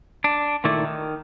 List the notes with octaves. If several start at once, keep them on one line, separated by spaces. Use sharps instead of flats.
D4
A#2 D#3 A3 E4 D5
D#3